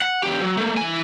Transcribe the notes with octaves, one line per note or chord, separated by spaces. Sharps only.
F#5
E2 G4
F#3
A3 A#3
E3 G#5